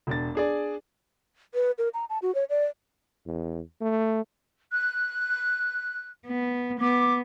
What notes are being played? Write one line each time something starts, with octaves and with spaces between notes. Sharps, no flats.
E1 D4 A6
D4 G#4 D5
B4
A#4
A#5
A5
F#4
C#5
D5
E2
A3
F#6
B3
B3 D6